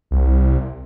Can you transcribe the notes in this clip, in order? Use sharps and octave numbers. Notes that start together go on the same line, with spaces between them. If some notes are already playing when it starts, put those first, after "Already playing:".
C2